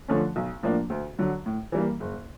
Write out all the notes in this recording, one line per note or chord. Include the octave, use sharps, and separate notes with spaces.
D3 F3 A3 C#4
B1
A2 F3 A#3 D4
D2
D3 F#3
A2
E3 G3 A#3
F#1